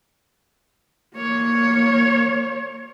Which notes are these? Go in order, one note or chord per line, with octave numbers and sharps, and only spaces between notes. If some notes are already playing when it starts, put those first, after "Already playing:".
A#3 C#5